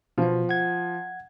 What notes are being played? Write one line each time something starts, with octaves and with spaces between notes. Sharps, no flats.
B2 F3 B3
F#5 G#6